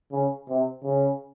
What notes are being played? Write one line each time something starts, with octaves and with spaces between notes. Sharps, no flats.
C#3
C3
C#3